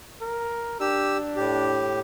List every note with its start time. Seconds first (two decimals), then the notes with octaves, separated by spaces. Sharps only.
0.21 A#4
0.80 D4 G4 E6
1.36 A2 G4